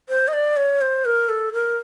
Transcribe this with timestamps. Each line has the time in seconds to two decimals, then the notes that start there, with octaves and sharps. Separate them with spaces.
0.09 C5
0.28 D#5
0.33 D5
0.57 C#5
0.81 C5
1.05 A#4
1.29 A4
1.53 A#4